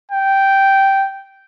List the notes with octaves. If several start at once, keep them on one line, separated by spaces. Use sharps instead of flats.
G5